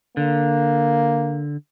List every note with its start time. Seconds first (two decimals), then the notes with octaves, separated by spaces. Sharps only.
0.17 D3 A#3